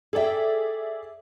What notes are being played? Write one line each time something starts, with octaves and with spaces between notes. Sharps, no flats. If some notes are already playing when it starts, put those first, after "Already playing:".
G#4 A4 D5 E5 G5